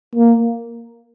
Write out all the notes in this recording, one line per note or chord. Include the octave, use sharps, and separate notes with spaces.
A#3